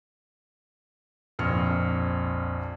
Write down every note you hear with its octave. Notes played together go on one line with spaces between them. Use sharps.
A#1 F2 F6 C#7